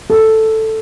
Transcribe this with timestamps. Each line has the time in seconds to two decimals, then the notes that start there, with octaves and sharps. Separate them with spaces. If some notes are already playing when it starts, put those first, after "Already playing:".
0.10 A4